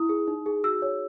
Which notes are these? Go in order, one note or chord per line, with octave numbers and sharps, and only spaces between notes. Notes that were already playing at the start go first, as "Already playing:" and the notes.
Already playing: E4 D#6
G#4
D#4
G#4
F#4 E6
C#5